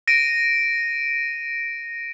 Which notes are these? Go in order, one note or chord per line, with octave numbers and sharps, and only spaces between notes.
A#6 D7 D#7